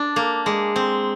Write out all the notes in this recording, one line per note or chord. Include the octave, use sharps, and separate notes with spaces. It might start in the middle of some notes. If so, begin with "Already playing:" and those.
Already playing: D4
A#3
G#3
C4